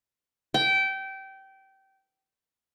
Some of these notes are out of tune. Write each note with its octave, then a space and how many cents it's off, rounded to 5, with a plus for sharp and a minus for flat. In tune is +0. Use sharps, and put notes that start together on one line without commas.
G5 -20